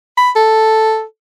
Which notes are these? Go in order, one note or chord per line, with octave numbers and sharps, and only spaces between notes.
B5
A4